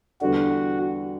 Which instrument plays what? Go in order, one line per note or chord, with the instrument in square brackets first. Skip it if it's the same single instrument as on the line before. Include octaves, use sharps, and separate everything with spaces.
[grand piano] E2 D3 G3 D4 A4 [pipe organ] F#4